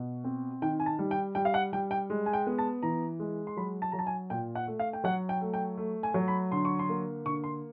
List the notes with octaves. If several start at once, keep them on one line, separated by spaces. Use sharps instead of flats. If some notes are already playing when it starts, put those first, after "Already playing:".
Already playing: B2
C4
D#3 G5
G#5
A5
G3
G5
G3 G5
F5
F#5
G3 G5
G5
G#3
G#5
G5
B3
A5
E3 A#5
G#3
C6
F#3 B5
A5
F#3 A#5
A5
G#5
A#2 G5
F#5
A3
F5
G5
F#3 F#5
G5
A3
G5
A3
G#5
F#3
B5
D3 C6
C#6
C6
A#3
D3 C#6
C6